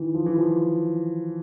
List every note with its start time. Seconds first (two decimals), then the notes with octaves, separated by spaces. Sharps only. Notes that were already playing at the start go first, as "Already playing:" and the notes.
Already playing: D#3 E3
0.14 F3
0.26 E3
0.37 F3